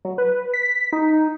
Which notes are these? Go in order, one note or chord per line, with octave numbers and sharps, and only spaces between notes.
F#3
B4
B6
D#4